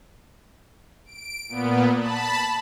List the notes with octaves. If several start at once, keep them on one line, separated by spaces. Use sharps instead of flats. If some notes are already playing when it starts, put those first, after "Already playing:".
D7
A#2 B3
A5 B5